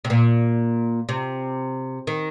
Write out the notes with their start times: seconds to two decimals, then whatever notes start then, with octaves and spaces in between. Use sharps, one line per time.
0.05 C3
0.10 A#2
1.09 C3
2.07 D#3